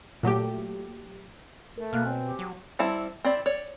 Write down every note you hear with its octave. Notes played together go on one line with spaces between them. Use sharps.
A#2 F#3 A3 G4
A3 A#4
B2 A#3 F6 F#6
C4 C#5 G#5
G4
F#3
G3 C4 E4 A5
C4 E4 D5
C#5 D5